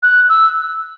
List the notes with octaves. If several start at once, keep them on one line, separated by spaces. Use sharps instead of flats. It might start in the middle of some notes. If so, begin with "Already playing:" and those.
F#6
E6